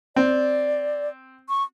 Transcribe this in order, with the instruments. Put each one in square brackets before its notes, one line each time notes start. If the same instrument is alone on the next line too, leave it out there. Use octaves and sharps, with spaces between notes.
[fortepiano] C4 [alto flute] D5
[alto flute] C#6